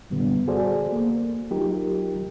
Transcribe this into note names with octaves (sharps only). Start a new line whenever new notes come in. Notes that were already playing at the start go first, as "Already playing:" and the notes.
F#2 A#2 D3 G3 B3
F#4 G#4 A4 C5 D5
A#3
F#3 D#4 F4 G4 A#4